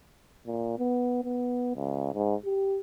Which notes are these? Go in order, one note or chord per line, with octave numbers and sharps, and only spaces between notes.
A#2
B3
B3
C#2
G#2
G4